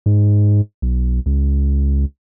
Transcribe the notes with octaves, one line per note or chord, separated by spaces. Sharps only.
G#2
B1
C#2